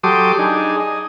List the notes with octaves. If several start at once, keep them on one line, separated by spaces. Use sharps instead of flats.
F#3 G4 A4 C6 D6 D#6
D4 D#4 G#4
D#5